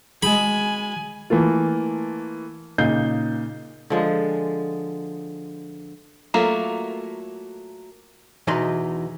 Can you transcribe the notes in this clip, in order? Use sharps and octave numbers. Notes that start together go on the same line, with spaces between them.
G#3 F#4 G#4 G#5 B5
E3 A3 A#3 F4
A#2 C#3 D#4 G6 C7
D3 F3 G#3
F#3 A3 A#3 F4 A#5
E2 B2 D#4 B4 D#5 C6